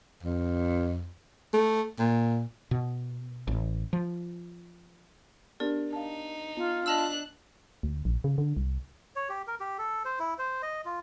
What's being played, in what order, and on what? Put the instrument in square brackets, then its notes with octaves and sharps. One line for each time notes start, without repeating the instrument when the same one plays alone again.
[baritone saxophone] F2
A3
A#2
[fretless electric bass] B2
A1
F3
[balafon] B3 D4 G4 [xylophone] A#4 D5
[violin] D#4 [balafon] F5 A5
[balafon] B3 [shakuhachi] F4
[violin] D4 F#6 [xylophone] D#5 A5 E6
[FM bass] D2
A#1
C#3
D3
C2
[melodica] C#5
G4
A#4
G4
A4
C5
E4
C5
D#5
F4